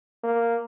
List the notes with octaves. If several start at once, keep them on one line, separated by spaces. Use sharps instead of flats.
A#3